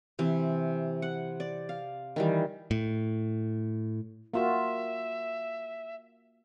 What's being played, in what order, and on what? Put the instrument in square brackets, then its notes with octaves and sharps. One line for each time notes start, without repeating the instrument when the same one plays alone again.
[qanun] C3 E3
F#5
D5
F5
D#3 E3 G3
[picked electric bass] A2
[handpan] A#3 F4 F#4 [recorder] E5